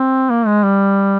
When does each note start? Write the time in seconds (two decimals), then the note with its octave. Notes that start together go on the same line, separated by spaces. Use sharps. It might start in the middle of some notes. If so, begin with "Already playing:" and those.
Already playing: C4
0.30 A#3
0.46 G#3
0.64 G3